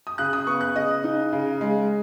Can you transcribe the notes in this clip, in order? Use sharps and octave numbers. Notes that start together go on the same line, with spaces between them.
D#6
C#3 F#6
D#6
B3 C#6
F#6
C#3 D#5
D#4
C#3
G#3